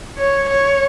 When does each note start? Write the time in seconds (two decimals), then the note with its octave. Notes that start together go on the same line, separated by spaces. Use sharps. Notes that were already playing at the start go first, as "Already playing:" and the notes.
0.18 C#5
0.49 C#5